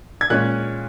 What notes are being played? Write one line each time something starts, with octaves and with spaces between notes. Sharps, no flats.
G#6
A#2 G#3 C#4 F#6